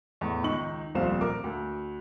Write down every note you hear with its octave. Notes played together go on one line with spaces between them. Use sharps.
E2 A2
C#2 D#3 D#4 C#6 F#7
D#1 C2 F2 C5 F5 E7
A#4 D6
D2